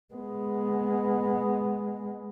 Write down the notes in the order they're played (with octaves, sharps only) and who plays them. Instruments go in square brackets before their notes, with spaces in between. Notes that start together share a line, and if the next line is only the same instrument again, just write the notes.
[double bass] G#3 B3